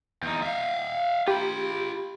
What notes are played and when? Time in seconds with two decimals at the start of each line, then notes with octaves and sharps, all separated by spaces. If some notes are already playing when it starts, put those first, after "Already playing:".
0.23 E2 D#4
0.43 E5 F5
1.28 F4 G4 B5